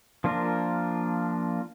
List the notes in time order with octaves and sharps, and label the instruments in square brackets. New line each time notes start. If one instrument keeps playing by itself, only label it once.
[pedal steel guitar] F3 A#3 D4 F4 A#4